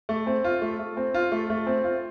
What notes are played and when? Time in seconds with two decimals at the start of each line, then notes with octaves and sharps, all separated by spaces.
0.09 A3
0.27 C4
0.44 F4
0.62 A3
0.79 A3
0.97 C4
1.14 F4
1.32 A3
1.50 A3
1.67 C4
1.84 F4